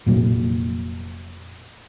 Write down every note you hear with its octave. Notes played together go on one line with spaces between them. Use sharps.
F1 A#2 F#3